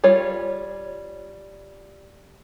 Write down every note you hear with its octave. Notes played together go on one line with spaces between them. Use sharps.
G3 F4 C#5